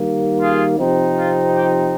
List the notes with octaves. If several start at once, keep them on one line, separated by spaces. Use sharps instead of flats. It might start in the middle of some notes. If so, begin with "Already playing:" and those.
Already playing: D#3 G3 A#3
F4 G#4
C3 F3 C4 D#4
F4
G4